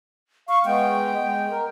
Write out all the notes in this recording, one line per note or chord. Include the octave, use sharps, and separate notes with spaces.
F5 C#6
G#3 B3 G5
G#3
A#4